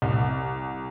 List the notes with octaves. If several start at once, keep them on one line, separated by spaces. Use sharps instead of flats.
C2